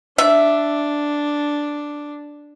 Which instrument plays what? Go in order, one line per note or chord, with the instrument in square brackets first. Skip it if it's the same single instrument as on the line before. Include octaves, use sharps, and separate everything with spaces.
[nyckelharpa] D4 [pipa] E5